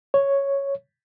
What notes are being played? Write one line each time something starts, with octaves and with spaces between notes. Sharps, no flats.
C#5